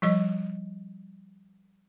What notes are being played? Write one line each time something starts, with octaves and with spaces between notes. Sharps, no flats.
F3 G3 D#5